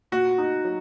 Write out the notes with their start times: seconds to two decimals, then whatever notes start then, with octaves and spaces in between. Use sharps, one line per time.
0.12 A#2 F#4
0.38 D#4
0.65 F#3